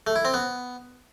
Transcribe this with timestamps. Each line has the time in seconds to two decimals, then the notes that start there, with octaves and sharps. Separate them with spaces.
0.07 A3
0.16 E4
0.25 C4
0.34 B3